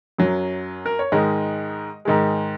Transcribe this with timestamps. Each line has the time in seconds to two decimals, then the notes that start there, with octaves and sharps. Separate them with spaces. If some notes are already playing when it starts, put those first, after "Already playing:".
0.18 F#2 F#3
0.86 A#4
0.99 C#5
1.12 G#2 D#3 G#3 D#5
2.05 G#2 D#3 G#3